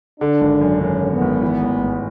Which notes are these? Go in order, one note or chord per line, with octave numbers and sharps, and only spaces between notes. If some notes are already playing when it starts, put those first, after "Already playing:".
D3 D4
G#1
F#2
G#1 C#4
D3
B3
G#1
E3
A1
G#2